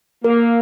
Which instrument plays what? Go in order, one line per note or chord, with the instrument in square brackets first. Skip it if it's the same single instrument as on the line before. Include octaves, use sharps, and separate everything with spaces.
[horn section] A#3 [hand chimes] A#4